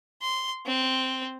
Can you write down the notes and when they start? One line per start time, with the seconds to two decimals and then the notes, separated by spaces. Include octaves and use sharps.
0.22 C6
0.66 C4